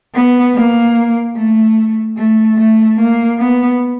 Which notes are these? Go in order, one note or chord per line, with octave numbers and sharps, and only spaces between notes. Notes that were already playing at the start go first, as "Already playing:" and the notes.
B3
A#3
A3
A3
A3
A#3
B3